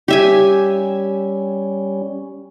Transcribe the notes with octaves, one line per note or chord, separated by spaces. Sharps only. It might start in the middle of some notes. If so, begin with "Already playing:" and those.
G3 C#4 G4 E5 G#5